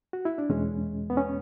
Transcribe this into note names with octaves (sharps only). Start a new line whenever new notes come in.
F#4
E4
D4
E2 B2 G#3 C#4
B3
C#4